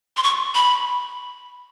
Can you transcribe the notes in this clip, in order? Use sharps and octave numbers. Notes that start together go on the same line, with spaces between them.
C6
C#6
B5